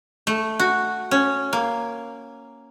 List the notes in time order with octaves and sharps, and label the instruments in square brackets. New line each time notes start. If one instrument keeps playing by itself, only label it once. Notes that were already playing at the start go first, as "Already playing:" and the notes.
[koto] A3
F#4
C#4
A#3